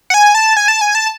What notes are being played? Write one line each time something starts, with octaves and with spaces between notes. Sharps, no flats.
F#5
G#5
A5
G#5
A5
G#5
A5